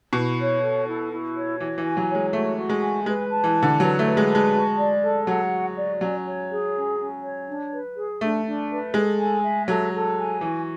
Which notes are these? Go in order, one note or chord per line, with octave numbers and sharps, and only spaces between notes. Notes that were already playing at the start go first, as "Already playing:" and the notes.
B2 E4
C#5
A4
E4
E4
C#5
E3 F#4
E3
G#5
F#3
C#5
G#3
A3 F#4
F#4
G#3
G#5
G#3 B4
A5
E3
F#5
D3
F#3 B4
A3
B4
G#3
A5
G#3
F#4
D5
A4
F#3 F#5
F#4
D5
F#3 C#4
C#5
G#4
C#4
C#4
C#5
D4
B4
G#4
A3 D4
D4
B4
G#3 A4
G#5
E5
F#3 A4
A4
G#5
E3 F#4